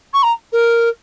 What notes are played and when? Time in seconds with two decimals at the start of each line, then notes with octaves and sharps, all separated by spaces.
0.13 C#6
0.22 A#5
0.52 A#4